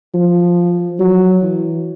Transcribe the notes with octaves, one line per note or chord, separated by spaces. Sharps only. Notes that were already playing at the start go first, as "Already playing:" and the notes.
F3
F#3
E3